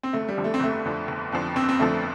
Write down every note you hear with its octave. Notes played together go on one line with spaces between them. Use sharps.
C4
G1 A3
G3
F2 D3 F3
A3
C4
G1 A3
F2 D3 F3
G1
F2 D3 F3
G1 C4
C4
F2 D3 F3 A3